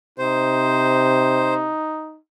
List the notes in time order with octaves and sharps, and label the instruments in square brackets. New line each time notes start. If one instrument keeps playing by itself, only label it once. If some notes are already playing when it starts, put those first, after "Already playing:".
[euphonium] C3 [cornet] D#4 [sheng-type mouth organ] C5